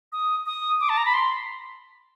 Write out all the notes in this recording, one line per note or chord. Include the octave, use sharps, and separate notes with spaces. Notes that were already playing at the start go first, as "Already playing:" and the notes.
D#6
D#6
D6
A5
A#5
B5
C6